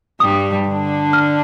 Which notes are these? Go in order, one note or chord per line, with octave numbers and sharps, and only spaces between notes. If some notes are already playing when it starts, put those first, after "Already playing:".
G2 G3 D#6
D3 D4
F6